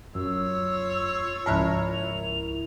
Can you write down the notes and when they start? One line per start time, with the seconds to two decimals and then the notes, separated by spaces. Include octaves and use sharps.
0.15 F#2 F4 C#5 E6
1.46 C#2 G#2 F3 E4 A#4 F#6
1.94 F7